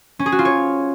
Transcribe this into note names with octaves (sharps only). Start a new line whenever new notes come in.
C#4
G#4
F#4
F4
C#5